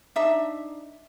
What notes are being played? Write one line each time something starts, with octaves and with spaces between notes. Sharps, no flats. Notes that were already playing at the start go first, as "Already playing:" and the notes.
D4 D#4 E5